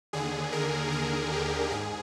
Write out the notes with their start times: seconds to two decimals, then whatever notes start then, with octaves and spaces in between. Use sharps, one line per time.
0.13 D#2 D3 G#4
0.52 A#4
0.92 G#4
1.32 G4
1.72 G#2 G#4